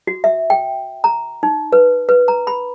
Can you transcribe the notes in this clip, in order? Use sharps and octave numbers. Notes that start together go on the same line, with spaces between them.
F#4
E5
G5
A#5
D#4
B4
B4
A#5
B5